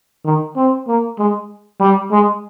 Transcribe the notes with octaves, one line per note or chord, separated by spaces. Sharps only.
D#3
C4
A#3
G#3
G3
G#3